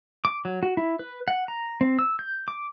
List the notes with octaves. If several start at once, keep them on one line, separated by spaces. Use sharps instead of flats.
D6
F#3
F#4
E4
B4
F#5
A#5
C4
E6
G6
D6